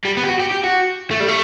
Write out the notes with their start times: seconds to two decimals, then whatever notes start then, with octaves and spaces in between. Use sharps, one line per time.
0.05 G3
0.17 B3
0.23 G4
0.29 F#4
0.40 G4
0.52 G4
0.64 F#4
1.11 A3
1.20 G3
1.28 A3